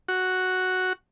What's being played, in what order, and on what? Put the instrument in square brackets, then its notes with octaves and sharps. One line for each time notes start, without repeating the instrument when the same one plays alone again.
[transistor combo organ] F#4